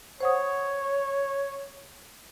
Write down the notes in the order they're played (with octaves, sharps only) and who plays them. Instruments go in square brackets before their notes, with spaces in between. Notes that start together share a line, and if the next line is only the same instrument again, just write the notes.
[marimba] C5 F#5 D#6 [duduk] C#5